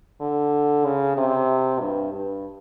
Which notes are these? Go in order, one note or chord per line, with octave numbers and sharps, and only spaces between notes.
D3
C#3
C3
G2
G2